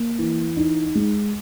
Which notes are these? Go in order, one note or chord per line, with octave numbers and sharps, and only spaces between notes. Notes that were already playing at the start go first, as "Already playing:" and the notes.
Already playing: A#3
E3
D#4
G#3